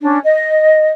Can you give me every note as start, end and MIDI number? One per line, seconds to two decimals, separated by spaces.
0.01 0.19 61
0.01 0.19 62
0.23 0.91 75